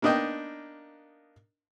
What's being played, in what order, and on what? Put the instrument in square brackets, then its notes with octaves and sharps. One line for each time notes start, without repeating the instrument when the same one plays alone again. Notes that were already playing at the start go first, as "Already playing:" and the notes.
[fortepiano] A#3 B3 D4 D#4 D#5 G5